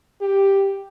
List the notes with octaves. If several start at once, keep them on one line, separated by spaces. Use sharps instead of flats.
G4